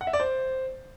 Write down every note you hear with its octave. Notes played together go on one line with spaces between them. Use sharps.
F#5
E5
D5
C5